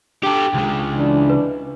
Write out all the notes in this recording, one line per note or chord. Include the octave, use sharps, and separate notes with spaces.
D4 G4 A4 G5 D6
C#2 C#3
E3 D4
B4